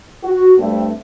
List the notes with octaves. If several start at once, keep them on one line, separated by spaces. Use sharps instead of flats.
F#4
G2 A3 C4